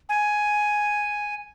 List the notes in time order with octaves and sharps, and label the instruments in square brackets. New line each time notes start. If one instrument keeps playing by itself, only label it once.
[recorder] G#5